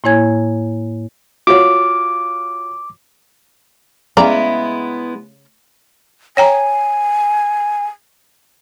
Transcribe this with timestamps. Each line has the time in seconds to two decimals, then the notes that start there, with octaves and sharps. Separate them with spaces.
0.04 A2 A#3 E4 C#5 G#5 G#6
1.47 F4 F#4 C#5 D6
4.17 C#3 G#3 B3 E4 D5 A#5
6.37 C#5 G5 G#5 A#5